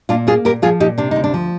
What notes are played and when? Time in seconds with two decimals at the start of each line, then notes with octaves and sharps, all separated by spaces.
0.09 A#2 D4 F4
0.27 A#3 F4 G#4
0.45 A#2 G4 A#4
0.62 F3 F4 G#4
0.80 A#2 D#4 G4
0.98 C3 D4
1.11 D2 D#4
1.24 D4
1.34 F3